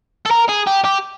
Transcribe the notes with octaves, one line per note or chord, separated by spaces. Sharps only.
A4
A#4
G#4
G4
G4